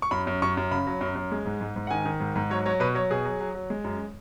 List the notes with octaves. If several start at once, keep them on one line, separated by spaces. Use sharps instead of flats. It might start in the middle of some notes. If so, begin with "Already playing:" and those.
C#6
F#2 B5
F#2
F#2 C#6
F#2
C#3 B5
F#3
F#2
F#2
G#3
G#2
G#2
G#2
F#5
D#3 G#5
D#3
G#2
G#2
F#3 C#5
F#3 C#5
B2 B4
F#3 C#5
B2 G#4
F#3
F#3
F#3
G#3
F#2